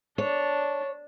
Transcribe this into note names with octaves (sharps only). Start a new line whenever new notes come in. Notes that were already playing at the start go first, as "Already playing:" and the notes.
D4 C#5 A5